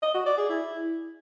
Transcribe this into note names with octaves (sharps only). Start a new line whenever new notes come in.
D#5
F#4
D5
G#4
E4